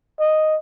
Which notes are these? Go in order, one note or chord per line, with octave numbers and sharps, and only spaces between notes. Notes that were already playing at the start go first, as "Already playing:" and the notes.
D#5